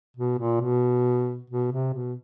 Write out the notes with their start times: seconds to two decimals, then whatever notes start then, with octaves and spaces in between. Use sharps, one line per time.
0.17 B2
0.38 A#2
0.61 B2
1.50 B2
1.72 C3
1.94 B2